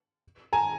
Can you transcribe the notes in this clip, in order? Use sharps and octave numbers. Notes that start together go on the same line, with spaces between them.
G#5 A#5